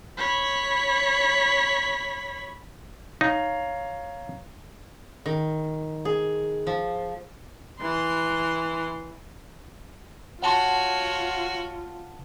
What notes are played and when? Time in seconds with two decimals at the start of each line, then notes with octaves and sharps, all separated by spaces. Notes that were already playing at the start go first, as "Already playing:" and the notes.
0.17 C#5 B5
3.21 D#4 C#5 F5 A#5
5.26 D#3
6.05 G#4
6.67 F3
7.81 E3 C6
10.43 F4 F#4 C#5 F#5 A5 C6